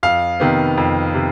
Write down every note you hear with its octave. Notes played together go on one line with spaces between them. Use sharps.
F2 F5
C3 D#3 B3
F2
C3